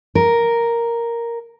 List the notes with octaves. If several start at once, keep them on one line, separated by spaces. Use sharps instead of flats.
A#4